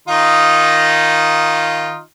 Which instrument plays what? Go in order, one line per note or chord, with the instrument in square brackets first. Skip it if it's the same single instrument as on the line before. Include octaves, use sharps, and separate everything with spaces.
[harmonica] D#3 D#4 F4